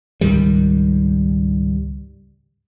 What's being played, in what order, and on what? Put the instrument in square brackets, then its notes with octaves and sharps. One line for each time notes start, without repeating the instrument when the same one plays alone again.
[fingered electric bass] C#2 G#2 D#3 G3